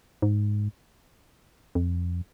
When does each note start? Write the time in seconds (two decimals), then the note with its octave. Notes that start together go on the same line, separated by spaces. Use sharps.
0.22 G#2
1.75 F2